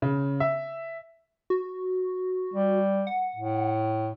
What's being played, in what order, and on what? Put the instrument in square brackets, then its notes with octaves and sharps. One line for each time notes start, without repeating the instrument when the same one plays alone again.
[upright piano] C#3
E5
[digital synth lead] F#4
[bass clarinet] G3
[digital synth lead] F#5
[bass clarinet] A2